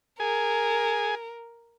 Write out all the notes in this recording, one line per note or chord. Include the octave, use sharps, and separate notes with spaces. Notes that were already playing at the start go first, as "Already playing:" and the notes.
G#4 A#4 G#5